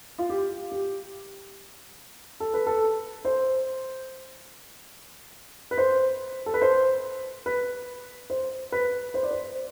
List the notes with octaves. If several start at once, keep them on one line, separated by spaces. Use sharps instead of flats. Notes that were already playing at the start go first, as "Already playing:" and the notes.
F4
G4
G4
A4
B4
A4
C5
B4
C5
A4
B4
C5
B4
C5
B4
C5
D5
C5